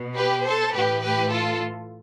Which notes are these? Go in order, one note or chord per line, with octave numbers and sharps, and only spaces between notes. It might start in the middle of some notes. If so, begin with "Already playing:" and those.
Already playing: B2
G4 B4
A4 C5
A2 E3 G4 B4
G4 B4
F4 A4